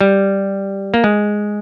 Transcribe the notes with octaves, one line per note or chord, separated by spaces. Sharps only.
G3
A#3
G#3